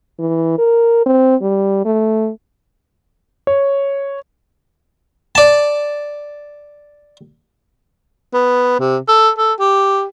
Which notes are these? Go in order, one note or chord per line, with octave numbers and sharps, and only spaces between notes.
E3
A#4
C4
G3
A3
C#5
D5 A5
B3
C3
A4
A4
G4